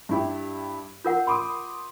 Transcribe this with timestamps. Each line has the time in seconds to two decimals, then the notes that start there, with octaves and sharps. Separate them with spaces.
0.09 G2 E4 G4
1.05 F4 A#4 F#5 G6
1.27 B5 C6 D6 D#6